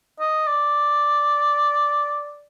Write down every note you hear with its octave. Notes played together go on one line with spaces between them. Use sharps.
D#5
D5